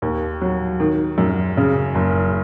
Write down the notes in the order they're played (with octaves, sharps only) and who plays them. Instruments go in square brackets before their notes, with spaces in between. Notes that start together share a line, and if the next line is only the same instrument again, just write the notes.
[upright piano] D#2
F#3
D#3
F#2
C#3
F#1